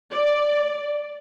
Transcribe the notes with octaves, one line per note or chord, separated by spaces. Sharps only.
D5